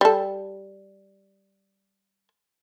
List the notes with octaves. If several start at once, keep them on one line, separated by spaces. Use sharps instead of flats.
G3 A4